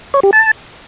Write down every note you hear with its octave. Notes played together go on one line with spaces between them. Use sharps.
C#5
G4
A5